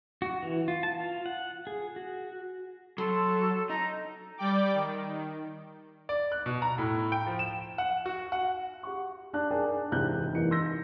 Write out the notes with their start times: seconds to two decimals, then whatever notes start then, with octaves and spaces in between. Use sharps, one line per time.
0.22 F#4
0.43 E3
0.68 F4
0.83 A5
1.00 F4
1.26 F#5
1.67 G#4
1.96 F#4
2.98 F#3 A4 C6
3.70 D#4 A#5
4.38 G3 D5 G5 D6
4.74 D#3
6.09 D5
6.32 F#6
6.46 B2
6.62 A#5
6.78 A2
7.12 G5
7.27 F3
7.39 E7
7.78 F#5
8.06 F#4
8.32 F#5
8.83 G4 F#5 C#6
9.33 D4 A5 F#6
9.50 D4 G#4 A#4 G5 A5
9.91 E1 G#2 C3 E4 F#6 G6
10.33 A1 E2 E3 A#3 D#4 C#7
10.51 C6 E6 G6 A#6